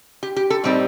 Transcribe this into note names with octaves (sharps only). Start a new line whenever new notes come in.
G4
G4
A4
A2 G3 C4 D#4 G4